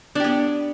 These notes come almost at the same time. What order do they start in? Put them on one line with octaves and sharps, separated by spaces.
D4 G4 B3